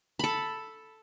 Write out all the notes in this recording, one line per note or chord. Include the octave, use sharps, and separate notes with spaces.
A4 B5